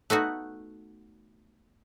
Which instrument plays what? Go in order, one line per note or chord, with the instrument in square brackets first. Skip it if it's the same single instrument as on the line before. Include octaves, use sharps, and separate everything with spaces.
[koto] A3 B3 D#4 F#4